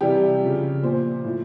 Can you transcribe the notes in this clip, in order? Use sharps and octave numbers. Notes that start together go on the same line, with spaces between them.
C3 E3 G3 G4
C#3 F3
A#2 F3 C5
A2 F3